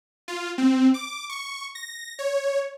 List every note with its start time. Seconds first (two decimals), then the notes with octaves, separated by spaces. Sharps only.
0.28 F4
0.58 C4
0.94 D6
1.30 C#6
1.75 A#6
2.19 C#5